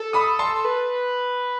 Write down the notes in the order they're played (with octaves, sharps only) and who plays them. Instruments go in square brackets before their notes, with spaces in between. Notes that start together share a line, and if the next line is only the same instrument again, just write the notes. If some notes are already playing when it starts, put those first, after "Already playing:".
Already playing: [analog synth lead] A4
[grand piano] B5 D#6
A5 C6
[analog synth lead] B4